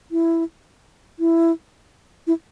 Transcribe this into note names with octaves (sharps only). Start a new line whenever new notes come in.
E4
E4
E4